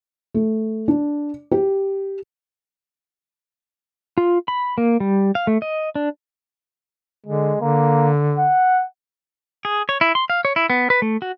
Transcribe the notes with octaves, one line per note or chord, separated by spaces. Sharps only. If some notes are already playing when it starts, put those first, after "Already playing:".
A3
D4
G4
F4
B5
A#3
G3
F5
A3
D#5
D4
D3 G#3
D3 A#3
F#5
G#4
C#5
E4
C6
F5
C#5
E4
B3
B4
A3
F#4